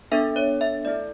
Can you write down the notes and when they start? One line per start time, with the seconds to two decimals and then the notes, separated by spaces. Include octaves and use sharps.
0.12 B3 D4 A4 E5
0.36 C#5
0.61 E5
0.85 A3 E4 A4 D5